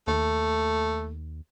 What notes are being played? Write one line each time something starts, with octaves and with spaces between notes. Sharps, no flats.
D#2 A3